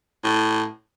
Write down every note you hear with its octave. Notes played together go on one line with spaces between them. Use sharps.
A2